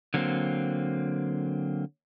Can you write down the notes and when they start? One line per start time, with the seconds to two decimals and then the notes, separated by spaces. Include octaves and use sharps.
0.14 D3 F#3 A#3 C4